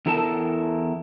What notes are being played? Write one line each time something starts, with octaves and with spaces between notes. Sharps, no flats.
E2 E4 A4 A#4 A5